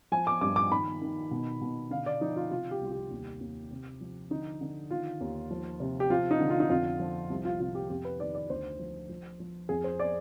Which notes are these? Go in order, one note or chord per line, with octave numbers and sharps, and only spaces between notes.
F3 G#5
D6
G2 D6
D6
D#3 B5
D#3
B2
B2
D3 F5
D5
F3 D#4
F4
C3 F4
G4
C2 F4
G4
D#2
D#2
C3
F3
D3 D#4
D3
D#3 F4
D#2
F3
C3
G4
F3 F4
D#4
D3
F4
D#4
F2 F4
F3
C2
F4
C3 F4
G4
F2 G4
B4
D#3 D5
D5
D2 C5
F3
F3
F3
F2 G#4
C5
D5